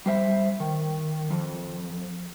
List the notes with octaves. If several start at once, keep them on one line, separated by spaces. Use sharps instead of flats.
G3 C5 E5
D#3
F2